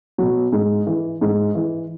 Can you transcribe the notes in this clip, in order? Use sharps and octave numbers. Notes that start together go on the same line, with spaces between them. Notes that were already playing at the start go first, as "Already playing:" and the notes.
B2 F#3
G#2
E3
G#2
E3